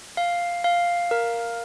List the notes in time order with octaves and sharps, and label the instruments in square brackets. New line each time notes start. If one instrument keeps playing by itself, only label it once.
[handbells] F5
F5
A#4